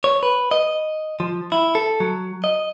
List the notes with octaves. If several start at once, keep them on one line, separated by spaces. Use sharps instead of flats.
C#5
B4
D#5
F3
E4
A4
F#3
D#5